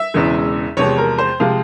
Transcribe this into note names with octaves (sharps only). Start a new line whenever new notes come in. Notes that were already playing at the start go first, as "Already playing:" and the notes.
Already playing: E5
E1 E2 C#3 E3 G#3
E2 C3 F3 G#3 C#5
A#4
C5
C3 F3 G#3 F5